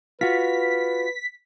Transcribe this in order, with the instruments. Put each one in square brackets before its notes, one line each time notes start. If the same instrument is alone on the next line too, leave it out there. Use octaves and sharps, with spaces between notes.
[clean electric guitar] F4 F#4 [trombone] B4 [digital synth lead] B6